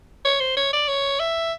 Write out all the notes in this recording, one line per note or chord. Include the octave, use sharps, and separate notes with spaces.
C#5
C5
C#5
D5
C#5
E5